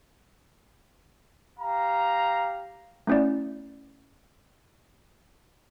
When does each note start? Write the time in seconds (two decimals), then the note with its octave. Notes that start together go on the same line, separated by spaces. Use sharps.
1.60 G4 F5 A#5
3.07 A3 B3 C#4 E4 D5